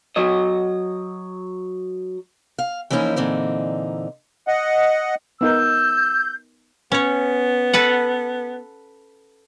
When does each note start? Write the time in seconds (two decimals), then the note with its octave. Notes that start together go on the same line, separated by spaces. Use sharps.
0.16 F#3 D#5
2.59 F5
2.90 E3 F3 A#3 C#4 D#4 E4
3.16 A#2 D3 E3 C4 D#4
4.47 D#5 F#5
5.41 B3 D#4 A#4 E6 G6
6.92 B3 C#4 C#5
7.73 A4 B4 F#5